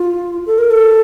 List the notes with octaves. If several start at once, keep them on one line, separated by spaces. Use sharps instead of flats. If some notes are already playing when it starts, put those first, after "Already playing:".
Already playing: F4
A4
A#4
A4